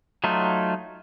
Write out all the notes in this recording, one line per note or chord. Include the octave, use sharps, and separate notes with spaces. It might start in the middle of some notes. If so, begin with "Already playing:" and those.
F#3 A3 D#4 F4